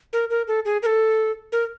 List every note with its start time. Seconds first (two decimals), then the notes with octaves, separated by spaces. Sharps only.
0.13 A#4
0.30 A#4
0.48 A4
0.65 G#4
0.82 A#4
0.86 A4
1.52 A#4